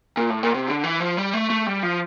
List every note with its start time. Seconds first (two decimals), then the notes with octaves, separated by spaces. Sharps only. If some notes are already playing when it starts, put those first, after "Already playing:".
0.17 A#2
0.30 A2
0.43 A#2
0.54 C3
0.67 D3
0.84 E3
1.00 F3
1.17 G3
1.33 A3
1.50 A3
1.66 G3
1.83 F3